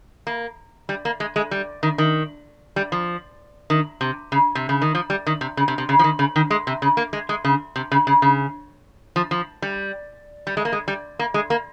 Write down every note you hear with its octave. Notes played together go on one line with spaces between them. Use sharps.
A#3
G3
A#3
G#3
G#3
G3
D#3
D#3
G3
F3
D#3
C3
C#3
C3
C#3
D#3
F3
G3
D#3
C3
C#3
C3
C3
C#3
F3
D#3
C#3
D#3
G#3
C3
C#3
A#3
G#3
G#3
C#3
C3
C#3
C#3
C#3
F3
F3
G3
G3
G#3
A#3
G#3
G3
A#3
G#3
A#3